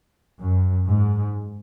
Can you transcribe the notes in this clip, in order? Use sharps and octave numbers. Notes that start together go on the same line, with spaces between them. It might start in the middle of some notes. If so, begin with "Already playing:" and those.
F#2
G#2